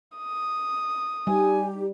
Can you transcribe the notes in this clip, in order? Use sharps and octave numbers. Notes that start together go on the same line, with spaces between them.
D#6
G3 D#4 G4 G#5